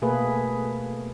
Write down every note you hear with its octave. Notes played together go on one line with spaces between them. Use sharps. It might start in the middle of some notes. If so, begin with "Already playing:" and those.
B2 A3 A#3 G#4 B4